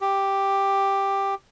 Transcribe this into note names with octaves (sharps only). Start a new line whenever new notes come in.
G4